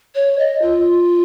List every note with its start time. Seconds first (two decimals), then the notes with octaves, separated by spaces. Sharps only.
0.15 C#5
0.38 D#5
0.61 F4